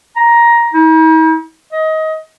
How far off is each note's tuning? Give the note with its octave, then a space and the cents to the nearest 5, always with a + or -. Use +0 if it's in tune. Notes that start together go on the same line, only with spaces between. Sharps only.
A#5 +10
D#4 +45
D#5 +25